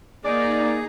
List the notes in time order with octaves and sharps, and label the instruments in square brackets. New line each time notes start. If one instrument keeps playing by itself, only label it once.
[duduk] A#3 [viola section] D#4 [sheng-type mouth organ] G#4 [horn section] D5